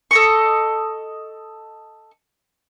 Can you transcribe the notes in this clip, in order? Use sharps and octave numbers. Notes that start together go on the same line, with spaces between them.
A4 D#5 C#6